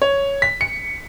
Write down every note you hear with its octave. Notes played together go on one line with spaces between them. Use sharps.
C#5
B6
C#7